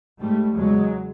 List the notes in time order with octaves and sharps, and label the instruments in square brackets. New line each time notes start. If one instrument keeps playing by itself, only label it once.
[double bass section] G#2 G3 A3
E2 C#3 F#3 G#3